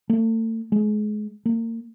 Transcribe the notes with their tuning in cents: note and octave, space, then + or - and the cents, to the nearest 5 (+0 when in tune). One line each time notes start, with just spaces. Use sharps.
A3 +40
G#3 +30
A#3 -35